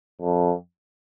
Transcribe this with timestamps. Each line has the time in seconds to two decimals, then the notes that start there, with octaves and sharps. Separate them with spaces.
0.22 F2